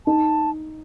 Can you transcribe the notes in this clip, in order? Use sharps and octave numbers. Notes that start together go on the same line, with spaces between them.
D#4 A5